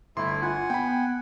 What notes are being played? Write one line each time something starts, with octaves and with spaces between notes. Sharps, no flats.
G1 A3 E4 C6
F4 F#5 G#5
B3 G5 B5